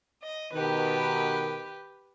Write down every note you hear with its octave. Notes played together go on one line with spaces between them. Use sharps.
D#5
B2 D#3 G4 B4